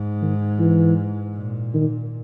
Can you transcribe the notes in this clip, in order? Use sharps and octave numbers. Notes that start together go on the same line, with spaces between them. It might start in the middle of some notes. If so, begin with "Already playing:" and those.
Already playing: G#2
D#3
E3
A#2
D#3